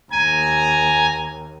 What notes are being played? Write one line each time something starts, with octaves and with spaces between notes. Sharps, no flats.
D#2 G#5 A#5